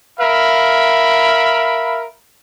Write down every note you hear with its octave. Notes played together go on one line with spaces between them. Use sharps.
A#4 E5 F5 B5